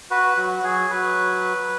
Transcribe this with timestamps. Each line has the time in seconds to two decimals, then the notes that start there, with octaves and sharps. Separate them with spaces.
0.11 F#4 B4
0.37 F#3 F#4
0.63 F#3 G#4
0.90 F#3 B4